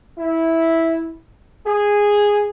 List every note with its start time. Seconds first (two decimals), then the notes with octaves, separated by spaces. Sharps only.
0.18 E4
1.67 G#4